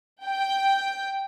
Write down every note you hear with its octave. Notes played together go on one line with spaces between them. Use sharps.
G5